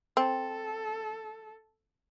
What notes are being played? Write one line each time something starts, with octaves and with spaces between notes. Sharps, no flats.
C4 A4